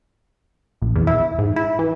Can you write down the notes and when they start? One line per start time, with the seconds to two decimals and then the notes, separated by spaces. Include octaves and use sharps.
0.82 A#1
0.96 E2
1.07 E4
1.38 G#2
1.56 E4
1.79 E3